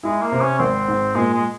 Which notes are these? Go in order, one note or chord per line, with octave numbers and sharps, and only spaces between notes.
G#3 E4
A#3
C3
C#4
G#1 C4
G#2
A#2 G#3
G#3